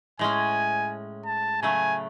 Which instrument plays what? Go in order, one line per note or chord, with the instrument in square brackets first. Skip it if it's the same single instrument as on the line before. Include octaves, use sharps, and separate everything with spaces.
[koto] A2 G#3 C#4 [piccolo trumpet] G#5
[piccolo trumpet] A5
[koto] C#3 F#3 A3 [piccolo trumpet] G#5